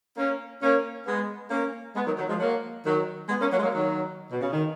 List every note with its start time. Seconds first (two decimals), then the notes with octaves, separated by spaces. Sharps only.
0.17 A#3 C#4
0.62 A#3 C#4
1.06 G#3 B3
1.51 A#3 C#4
1.95 G#3 B3
2.06 D#3 F#3
2.18 D#3 F#3
2.29 F3 G#3
2.40 F#3 A#3
2.85 D#3 F#3
3.29 G#3 B3
3.40 A#3 C#4
3.52 F#3 A#3
3.58 G#3
3.63 F#3 A#3
3.74 D#3 F#3
4.31 B2
4.41 C#3
4.52 D#3